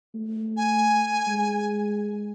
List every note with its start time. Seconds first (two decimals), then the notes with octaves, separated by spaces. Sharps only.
0.15 A3
0.57 G#5
1.28 G#3